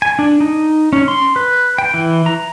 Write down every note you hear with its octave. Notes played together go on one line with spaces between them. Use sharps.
G#5
D4
D#4
C#4
C6
B4
G5
E3
A#5